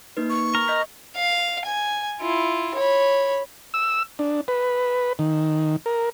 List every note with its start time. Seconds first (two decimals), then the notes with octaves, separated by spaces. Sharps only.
0.17 A#3 D#4 B4
0.30 C#6
0.55 A#4
0.68 D#5 G6 B6
1.16 F5
1.66 G#5
2.21 E4 F4
2.75 C#5 B5
3.74 E6
4.19 D4
4.48 B4
5.19 D#3
5.86 A#4